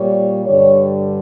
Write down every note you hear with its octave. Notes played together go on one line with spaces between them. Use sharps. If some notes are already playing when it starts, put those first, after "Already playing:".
Already playing: A#2 G3 C#5
G2 D3 G3 C#5